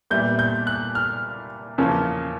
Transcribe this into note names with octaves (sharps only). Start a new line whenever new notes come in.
A#2 G3 B3 E4 G6
G6
F#6
F6
E2 C#3 F3 A#3 C#4